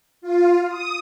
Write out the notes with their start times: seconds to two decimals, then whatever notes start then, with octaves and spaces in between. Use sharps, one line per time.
0.22 F4
0.68 D#6